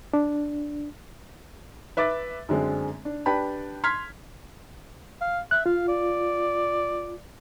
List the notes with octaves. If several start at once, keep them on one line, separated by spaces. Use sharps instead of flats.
D4
B4 E5 D6 A6
F#2 D3 G#3 C4
D4
D4 G4 B4 G5 A5 B5
C6 F6 G#6 B6
F5
E5 F#6
F4 F5
D5